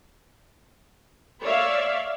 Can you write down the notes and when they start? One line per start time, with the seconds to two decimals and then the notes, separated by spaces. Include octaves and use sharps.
1.42 C#5 D5 E5 F5